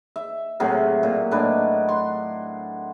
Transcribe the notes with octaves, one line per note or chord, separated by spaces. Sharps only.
E5
A2 C3 F#3 G#4
A#2
A2 D4 B4 D#5
C6